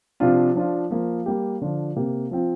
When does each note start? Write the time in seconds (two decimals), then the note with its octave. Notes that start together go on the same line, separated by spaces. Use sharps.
0.20 C3 F3 D4 F4
0.55 F3 D4 F4
0.91 F3 A#3 F4
1.26 G3 A#3 G4
1.61 D3 F3 D4 F4
1.96 C3 A#3 G4
2.31 F3 C4 F4